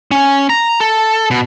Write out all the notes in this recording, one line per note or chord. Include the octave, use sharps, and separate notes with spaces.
C#4
A#5
A4
B2